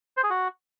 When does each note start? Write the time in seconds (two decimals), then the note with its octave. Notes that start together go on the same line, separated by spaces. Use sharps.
0.17 C5
0.24 G#4
0.30 F#4